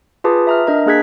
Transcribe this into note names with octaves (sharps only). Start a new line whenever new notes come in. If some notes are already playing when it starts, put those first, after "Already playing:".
F4 G#4 B4 A5 D6 D#6
E5 A#5 F6
D4 A#4 D#5 A#5
A#3 D4 G#4 F#6 G#6 B6